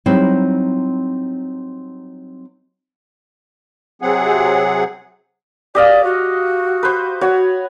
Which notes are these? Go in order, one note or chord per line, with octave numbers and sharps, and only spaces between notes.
F#3 G3 C4 D#4 E4
C3 F#3 C4 G#4 F#5
G4 D5 D#5 F5
F#4
B4 C5
F#4 C#5 F#5